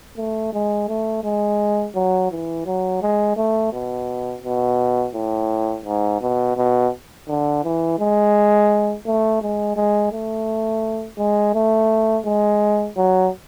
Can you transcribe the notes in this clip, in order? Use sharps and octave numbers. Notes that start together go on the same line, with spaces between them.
A3
G#3
A3
G#3
F#3
E3
F#3
G#3
A3
B2
B2
A2
G#2
B2
B2
D3
E3
G#3
A3
G#3
G#3
A3
G#3
A3
G#3
F#3